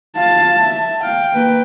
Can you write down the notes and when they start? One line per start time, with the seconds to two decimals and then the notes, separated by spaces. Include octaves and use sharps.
0.17 F4 F5 A5
0.61 E5
1.04 F5 G5
1.34 A#3 B4